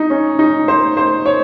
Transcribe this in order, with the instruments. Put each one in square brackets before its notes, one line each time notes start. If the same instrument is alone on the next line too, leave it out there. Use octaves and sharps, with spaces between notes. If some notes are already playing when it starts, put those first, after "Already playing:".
Already playing: [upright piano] D#4
C#4
D#4
C5
C5
C#5